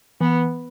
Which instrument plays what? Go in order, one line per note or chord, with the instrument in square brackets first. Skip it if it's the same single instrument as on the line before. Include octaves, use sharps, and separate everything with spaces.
[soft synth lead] E3 [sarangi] B3